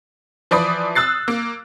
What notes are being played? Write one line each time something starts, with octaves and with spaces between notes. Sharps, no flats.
E3 F3 D5 B5 D#6
D#6 E6 F#6 A6 C7
A#3